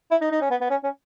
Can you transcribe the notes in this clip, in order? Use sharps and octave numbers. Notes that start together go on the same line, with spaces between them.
E4
D#4
D#4
C#4
B3
B3
C#4
C#4